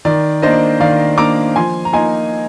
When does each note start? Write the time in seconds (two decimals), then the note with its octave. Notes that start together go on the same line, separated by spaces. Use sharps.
0.05 D#3 D5
0.42 A#3 D4 C5 D#5
0.80 D#3 D5 F5
1.18 A#3 D4 A#5 D6
1.56 F3 G#5 C6
1.85 A#5
1.93 A#3 D#4 G#5 C6